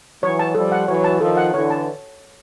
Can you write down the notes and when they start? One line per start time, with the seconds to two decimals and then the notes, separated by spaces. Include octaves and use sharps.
0.22 E3 F#3 C#5
0.39 A5
0.55 F3 G3 A4
0.72 F#5
0.88 E3 F#3 C#5
1.04 A5
1.20 D#3 F3 A4
1.37 F#5
1.53 D3 E3 C#5
1.70 A5